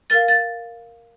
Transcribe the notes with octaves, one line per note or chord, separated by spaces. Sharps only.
A#4 F5 A6
A6